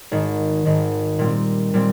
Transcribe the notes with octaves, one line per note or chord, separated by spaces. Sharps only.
G#1 G#2 D#3
G#1 G#2 D#3
A#2 G3 C4
A#2 G3 C4